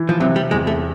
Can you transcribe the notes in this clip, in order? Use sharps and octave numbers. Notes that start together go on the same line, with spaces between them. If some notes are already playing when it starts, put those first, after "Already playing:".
Already playing: E3
F3
C3 F#3
G3
E2 G#3
A3